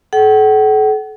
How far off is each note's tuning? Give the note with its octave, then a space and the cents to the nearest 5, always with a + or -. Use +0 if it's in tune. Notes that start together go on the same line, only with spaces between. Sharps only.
A4 -40 F#5 +40